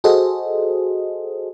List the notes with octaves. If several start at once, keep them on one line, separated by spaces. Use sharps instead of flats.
F#4 G#4 A4 C5 D#5